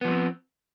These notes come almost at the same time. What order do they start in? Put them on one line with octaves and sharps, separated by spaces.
B3 F3 G3 C4